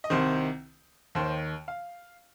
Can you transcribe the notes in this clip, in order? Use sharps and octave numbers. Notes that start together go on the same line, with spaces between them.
D#5
C2 C3 D#3 C5
D#2 D#3 C5
F5